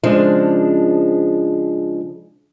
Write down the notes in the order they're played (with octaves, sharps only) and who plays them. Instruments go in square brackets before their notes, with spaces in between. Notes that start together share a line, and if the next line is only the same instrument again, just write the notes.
[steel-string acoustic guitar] C#3 F3 G#3 D4